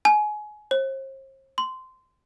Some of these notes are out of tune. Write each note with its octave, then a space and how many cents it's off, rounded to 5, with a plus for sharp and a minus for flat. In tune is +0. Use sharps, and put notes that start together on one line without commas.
G#5 +25
C5 +40
C6 -15